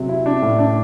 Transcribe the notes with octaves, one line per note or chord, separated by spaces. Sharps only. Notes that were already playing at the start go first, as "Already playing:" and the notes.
Already playing: C3 F#3
E4
D4
A2
D4